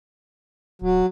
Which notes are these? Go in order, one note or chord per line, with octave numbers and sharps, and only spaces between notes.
D1 F#3